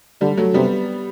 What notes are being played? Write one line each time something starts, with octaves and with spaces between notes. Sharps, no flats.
D3 G3
F#3 A3
C3 G3 B3